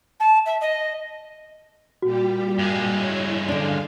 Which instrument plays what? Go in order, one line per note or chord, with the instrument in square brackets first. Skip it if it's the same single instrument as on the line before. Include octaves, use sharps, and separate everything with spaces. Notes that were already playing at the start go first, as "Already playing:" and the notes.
[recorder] A5
E5
D#5
[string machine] A#2 G3 G4 [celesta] F#4
[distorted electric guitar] G2 G#3
[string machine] E4 C#5
[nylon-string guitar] D3 D4 [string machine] F5